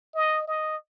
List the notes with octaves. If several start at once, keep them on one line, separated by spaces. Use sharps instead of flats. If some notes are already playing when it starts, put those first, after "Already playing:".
D#5
D#5